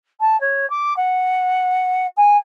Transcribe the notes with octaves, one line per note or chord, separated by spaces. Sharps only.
A5
C#5
D6
F#5
G#5